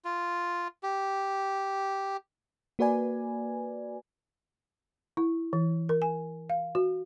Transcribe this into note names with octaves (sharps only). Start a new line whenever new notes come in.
F4
G4
A#3 F#4 B4 D5 G#5
E4
E3
A#4
G#5
F5
F#4